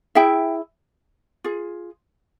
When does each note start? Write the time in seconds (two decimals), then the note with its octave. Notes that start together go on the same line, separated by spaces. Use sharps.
0.15 E4 G#4 E5 G5
1.44 F4 G#4